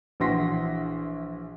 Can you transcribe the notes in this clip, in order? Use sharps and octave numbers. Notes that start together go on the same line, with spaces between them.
A#1 E3 F#4 C6 A#6 B6